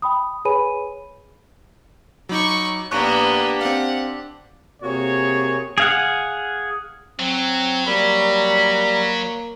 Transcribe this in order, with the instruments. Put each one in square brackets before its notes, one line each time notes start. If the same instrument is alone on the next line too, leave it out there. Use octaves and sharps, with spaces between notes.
[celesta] G5 B5 D#6
G#4 B4 C#5 G#5 B5 D#7
[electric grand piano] F#3 D#4 [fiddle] B5 C#6 [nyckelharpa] D6
[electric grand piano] A#1 C#6 F#6 [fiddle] A#3 B3 [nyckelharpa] D4 G4
[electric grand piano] C4 F5 [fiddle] F#5
[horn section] C3 A#3 F#4 G#4 C#5
[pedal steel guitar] G#4 F5 F#5
[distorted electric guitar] F#3 [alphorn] C4
[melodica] G3 B5 [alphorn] A#3